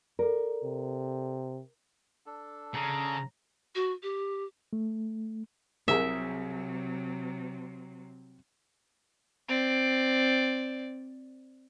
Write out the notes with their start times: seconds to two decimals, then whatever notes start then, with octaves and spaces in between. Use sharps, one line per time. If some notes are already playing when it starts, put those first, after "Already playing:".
0.19 A4 A#4 D5
0.64 C3
2.26 D4 A4
2.75 C#3 A#5
3.75 F#4
4.03 G4
4.73 A3
5.88 C2 C3 F#3 G#4 A#4 E5
9.48 C4 D5